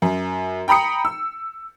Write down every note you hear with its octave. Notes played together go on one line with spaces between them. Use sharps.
F#2
G5 A#5 B5 D#6 C#7
E6